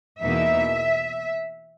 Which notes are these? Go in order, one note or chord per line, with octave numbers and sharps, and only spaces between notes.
E2 B2 A#3 D#4 E5